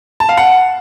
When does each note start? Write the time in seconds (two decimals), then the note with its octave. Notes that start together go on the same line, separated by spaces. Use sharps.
0.20 A5
0.29 F5
0.37 F#5